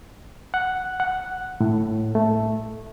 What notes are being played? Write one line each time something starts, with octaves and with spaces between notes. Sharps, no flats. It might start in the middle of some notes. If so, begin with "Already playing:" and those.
F#5
F#5
A2
A3